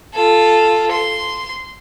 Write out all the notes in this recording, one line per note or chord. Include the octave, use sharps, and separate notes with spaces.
F4 A4
C6